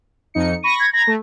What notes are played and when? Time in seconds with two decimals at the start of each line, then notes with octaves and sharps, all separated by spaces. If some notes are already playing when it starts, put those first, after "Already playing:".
0.34 F2 D#4 C#7
0.63 B5 C#6 A#6 D#7
0.80 G#6
0.93 A#5 B5 G#6 A#6
1.07 A3